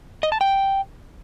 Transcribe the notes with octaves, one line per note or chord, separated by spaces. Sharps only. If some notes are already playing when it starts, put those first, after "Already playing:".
D#5
A5
G5